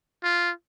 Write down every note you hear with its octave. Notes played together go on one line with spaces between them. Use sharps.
F4